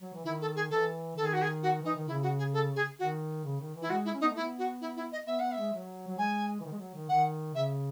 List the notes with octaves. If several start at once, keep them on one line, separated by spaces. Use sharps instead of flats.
F#3
E3
D#3 E4
A4
G#4
E3 A4
D#3 A4
G#4
F#4
G#4
F#4
E3 D#4
D#3
C#3 E4
F#4
G#4
A4
G#4
D#3 F#4
C#3
D#3
E3
E4
G#3 F#4
E4
C#4
B3 D#4
A3
B3 E4
F#4
E4
E4
D#5
B3 E5
B3 F#5
E5
G#3
F#3
F#3
G#3 G#5
E3
D#3
G#3
F#3
D#3
D#3 F#5
C#3 E5